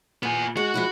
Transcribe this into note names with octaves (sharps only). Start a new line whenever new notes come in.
A#2 B3 G#5
G#3 F#4
F3 G#3 E4